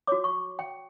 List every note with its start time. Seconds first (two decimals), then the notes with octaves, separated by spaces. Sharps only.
0.07 F#4 C#5 D6
0.24 C#6
0.59 G5